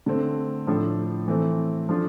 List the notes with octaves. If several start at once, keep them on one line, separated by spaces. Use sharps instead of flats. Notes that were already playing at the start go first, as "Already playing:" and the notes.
D3 A3 C4
A2 F3 A3 D4 A4
E3 A3 C4
F3 A3 D4 F4